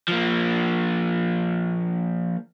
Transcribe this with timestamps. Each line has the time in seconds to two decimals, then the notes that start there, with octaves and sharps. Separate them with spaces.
0.08 F3 A#3